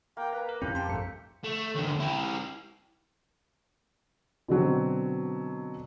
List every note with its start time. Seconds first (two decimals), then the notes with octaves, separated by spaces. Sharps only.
0.17 A#3 G5
0.32 B4 A#5
0.49 A#4
0.62 F2 C4 C#4 E4 G4
0.75 G5 A5 C6
0.88 A#1 G2 A3 C#7
1.44 A3
1.75 D#2 D3
2.00 E4 G4
4.48 B2 D3 F#3 C4